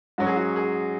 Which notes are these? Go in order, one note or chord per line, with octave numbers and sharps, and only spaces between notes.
G#2 F#3 C#4 F#4
G#4
F#4
G#4